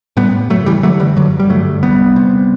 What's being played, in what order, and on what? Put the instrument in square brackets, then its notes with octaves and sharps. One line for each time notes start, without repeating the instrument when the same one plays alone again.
[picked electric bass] A2 G3 B3
F#1 F#3 A3
E3 G3
F#2 D3 F#3 A3
E3 G3
G1 D3 F#3
G3
G2 D3 F#3 A3
C2 G3 B3
C3